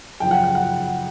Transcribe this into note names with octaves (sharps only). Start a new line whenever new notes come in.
F#2 C#3 F3 G5
F#5
F#5
F#5